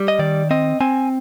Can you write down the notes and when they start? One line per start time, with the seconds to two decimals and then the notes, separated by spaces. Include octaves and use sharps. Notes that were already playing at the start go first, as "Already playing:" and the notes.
Already playing: G3
0.08 D#5
0.19 D#3 D5
0.51 C4 D#5
0.81 C4 G#5